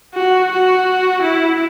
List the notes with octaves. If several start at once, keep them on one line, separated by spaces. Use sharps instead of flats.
F#4
F#4
E4